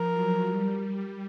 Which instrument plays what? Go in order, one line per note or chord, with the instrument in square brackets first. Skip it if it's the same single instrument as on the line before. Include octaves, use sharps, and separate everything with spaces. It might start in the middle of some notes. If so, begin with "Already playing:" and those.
Already playing: [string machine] F3 [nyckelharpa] A#4
[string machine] F#3
G3